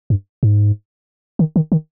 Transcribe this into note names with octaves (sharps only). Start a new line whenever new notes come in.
G2
G#2
D#3
D#3
D#3